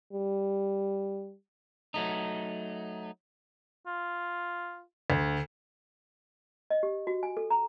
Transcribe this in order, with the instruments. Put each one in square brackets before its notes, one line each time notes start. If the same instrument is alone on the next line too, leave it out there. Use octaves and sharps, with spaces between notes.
[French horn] G3
[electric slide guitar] F#3 A3 D#4
[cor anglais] F4
[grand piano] D2
[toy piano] D#5
G4
F#4
G#5
A4
A#5